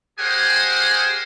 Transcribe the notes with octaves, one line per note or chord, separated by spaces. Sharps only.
G4 G#4 A#4 C5 F#5 G#5